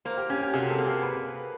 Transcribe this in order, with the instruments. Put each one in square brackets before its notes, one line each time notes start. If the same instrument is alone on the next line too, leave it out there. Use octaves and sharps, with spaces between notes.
[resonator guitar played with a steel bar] A#3 [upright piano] A#4 C5
[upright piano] G4
[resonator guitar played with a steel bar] C#4 [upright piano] G4
[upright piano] G4
[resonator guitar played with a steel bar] C3 [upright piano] F#4 G#4
[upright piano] G4 A4
[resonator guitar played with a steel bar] A#3
[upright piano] G#4 A#4
B4